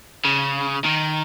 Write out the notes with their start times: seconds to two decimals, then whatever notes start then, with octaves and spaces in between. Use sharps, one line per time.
0.25 C#3
0.84 D#3